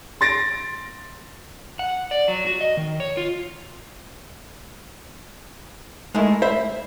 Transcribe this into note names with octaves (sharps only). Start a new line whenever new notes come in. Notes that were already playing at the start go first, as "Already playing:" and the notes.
C6 A6 A#6 D7
F#5
D5
F#3
F#4
D#5
D#3
C#5
F4
G#3 A3 D#4 E4 A#4
C5 E5 B5